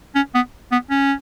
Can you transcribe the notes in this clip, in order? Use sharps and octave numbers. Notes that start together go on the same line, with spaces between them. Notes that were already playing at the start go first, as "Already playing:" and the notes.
C#4
B3
B3
C#4